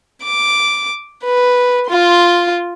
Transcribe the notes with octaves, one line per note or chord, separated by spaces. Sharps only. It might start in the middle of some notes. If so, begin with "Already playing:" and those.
D6
B4
F4 C6